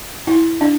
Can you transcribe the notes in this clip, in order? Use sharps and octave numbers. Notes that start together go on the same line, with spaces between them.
E4
D4